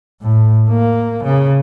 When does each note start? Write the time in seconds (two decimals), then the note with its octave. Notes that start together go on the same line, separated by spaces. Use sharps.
0.22 A2
0.69 A#3
1.25 C#3